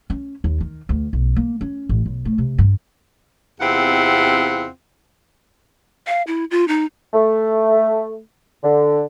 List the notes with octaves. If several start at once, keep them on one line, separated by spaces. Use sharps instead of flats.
C#4
D#2
D#3
D2
B1
A#3
C#4
A1
B1
A3
C3
G2
E2 C3 C4 E4 F4 F#5
F5
E4
F4
D#4
A3
D3